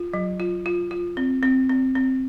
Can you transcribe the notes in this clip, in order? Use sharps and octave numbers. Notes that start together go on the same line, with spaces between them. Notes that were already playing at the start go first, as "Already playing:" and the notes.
Already playing: F4
F#3
F4
F4
F4
C4
C4
C4
C4